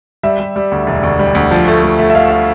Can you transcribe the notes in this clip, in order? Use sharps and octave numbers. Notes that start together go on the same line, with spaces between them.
G3 E5
G3
G3
D2
E1
D2
G3
D2
F3
A3
A3
A3
E5
A3 F5
F5